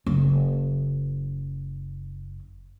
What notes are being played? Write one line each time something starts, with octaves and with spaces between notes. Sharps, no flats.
F#1 F#3